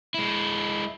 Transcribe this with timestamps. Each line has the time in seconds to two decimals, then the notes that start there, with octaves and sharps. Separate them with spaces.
0.14 G#3 E4